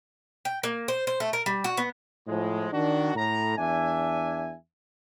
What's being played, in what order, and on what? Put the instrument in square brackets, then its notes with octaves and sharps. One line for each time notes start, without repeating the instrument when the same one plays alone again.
[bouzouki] G5
A#3
C5
C5
A3
A#4
G3
F#4
B3
[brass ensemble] A2 F3 G#3
D#3 D4 F#4
A2 A#5
E2 D4 E5 G#5